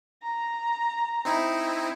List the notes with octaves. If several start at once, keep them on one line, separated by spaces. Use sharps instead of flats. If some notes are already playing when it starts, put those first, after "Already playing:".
A#5
C4 D#4 E4